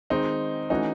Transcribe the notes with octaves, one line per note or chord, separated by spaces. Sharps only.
D#3 G#3 C4 D#4
E3 A3 C#4 D#4 F#4